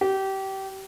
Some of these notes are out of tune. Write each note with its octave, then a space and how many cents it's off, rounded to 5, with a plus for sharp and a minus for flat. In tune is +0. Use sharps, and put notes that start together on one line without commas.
G4 -25